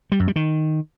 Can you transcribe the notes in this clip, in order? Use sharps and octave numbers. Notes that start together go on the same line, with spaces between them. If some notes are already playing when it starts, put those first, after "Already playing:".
G3
F#2
G3
D#3